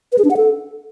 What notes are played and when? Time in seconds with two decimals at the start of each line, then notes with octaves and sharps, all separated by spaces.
0.12 B4
0.18 G#4
0.25 D4
0.31 F#5
0.37 A4